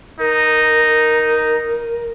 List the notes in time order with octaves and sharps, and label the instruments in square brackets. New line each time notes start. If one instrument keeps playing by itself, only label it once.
[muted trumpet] D#4 [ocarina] A#4